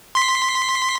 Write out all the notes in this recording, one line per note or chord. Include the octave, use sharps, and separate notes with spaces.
C6 B6